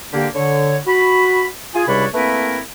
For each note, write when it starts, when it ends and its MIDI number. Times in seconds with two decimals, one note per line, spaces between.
0.13 0.27 50
0.13 0.27 58
0.13 0.27 67
0.35 0.79 50
0.35 0.79 73
0.87 1.46 66
0.87 1.46 83
1.75 1.84 65
1.75 1.84 68
1.75 1.84 80
1.88 2.07 37
1.88 2.07 48
1.88 2.07 55
1.88 2.07 62
1.88 2.07 73
1.88 2.07 83
2.14 2.59 57
2.14 2.59 58
2.14 2.59 60
2.14 2.59 64
2.14 2.59 70
2.14 2.59 71